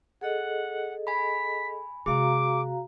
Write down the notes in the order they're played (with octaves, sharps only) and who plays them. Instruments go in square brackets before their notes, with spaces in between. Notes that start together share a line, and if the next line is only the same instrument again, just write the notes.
[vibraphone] G#4 A4 D#5 [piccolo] F#5
[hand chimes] G#5 B5 [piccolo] B6
[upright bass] C3 G#3 [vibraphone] F#4 F5 A#5 [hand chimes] G#4 [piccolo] D6